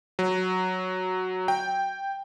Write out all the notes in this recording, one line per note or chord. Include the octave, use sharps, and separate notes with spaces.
F#3
G5